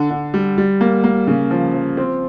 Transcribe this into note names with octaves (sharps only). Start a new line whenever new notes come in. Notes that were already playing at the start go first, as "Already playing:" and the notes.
Already playing: D3
D3
G3
G3
A#3
A#3
C#3
F3
F3
C4